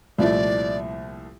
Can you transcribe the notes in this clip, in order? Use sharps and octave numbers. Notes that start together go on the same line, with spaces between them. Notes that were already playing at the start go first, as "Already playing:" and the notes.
C2 A#2 F3 A3 E4 D5